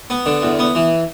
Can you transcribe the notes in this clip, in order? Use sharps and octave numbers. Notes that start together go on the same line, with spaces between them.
B3
D3
E2
B3
E3